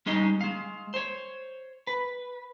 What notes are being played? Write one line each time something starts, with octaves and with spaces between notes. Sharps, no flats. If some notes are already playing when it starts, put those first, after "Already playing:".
G3 G#3 C#4 D#4 D#5
G#3 F5
C5 C#5
B4